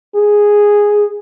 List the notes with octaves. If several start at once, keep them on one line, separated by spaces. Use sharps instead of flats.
G#4